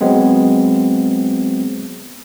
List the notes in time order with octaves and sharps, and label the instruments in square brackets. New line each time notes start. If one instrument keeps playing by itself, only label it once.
[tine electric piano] F#3 G#3 B3 C4